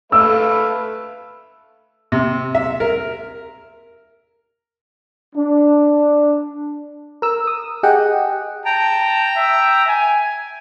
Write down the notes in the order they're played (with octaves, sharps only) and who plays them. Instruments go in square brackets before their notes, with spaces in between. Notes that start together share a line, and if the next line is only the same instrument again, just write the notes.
[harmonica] A3 B4 F5 [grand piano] E6
[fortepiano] C3
E5
A#4
[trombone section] D4
[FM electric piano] A#4 E6
D#6
G4 G#4 D#5 F#5 G5
[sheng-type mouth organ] G5 A#5 [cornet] A5
[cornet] E5
G#5